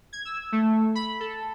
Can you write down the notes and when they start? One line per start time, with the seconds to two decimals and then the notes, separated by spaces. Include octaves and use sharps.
0.13 G#6
0.25 E6
0.52 A3
0.95 B5
1.20 A4